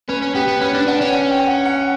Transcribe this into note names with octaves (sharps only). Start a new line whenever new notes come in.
C#4 B4
C#4
B3 G4
B3
C#4 B4
D4
D4 F#5
C#4
F#5
G5
F#5
F#5